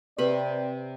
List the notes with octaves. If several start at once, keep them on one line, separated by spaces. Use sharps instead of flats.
C3 C4 G4 B4 D5 B5